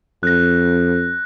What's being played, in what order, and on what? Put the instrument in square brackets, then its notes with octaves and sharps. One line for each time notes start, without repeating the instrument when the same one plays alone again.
[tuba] F2 [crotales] F#6 A#6